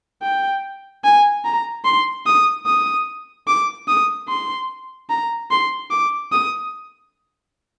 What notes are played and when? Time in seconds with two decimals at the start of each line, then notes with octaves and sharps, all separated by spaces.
0.22 G5
1.04 G#5
1.45 A#5
1.85 C6
2.26 D#6
2.66 D#6
3.47 D6
3.88 D#6
4.29 C6
5.10 A#5
5.51 C6
5.91 D6
6.32 D#6